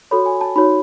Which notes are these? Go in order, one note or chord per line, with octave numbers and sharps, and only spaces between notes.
F#4 A4 C#5 B5
G#5
A5
D#4 F#4 C#5 B5